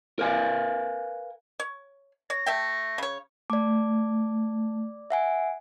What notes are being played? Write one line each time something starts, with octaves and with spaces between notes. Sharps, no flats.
A#4 B4 F5 G#5
C#5
C#5 A#6
A3 E5 G5
C#3 C#5
A3 D5 D6
E5 F#5 G#5